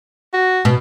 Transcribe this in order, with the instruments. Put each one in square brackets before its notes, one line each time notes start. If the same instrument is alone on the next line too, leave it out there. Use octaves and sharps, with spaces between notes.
[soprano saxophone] F#4
[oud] B2